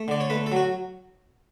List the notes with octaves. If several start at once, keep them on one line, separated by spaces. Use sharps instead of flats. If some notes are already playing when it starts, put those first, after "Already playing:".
Already playing: A3
D3 D5
C#5
A3 B4
A4
F#3 F#4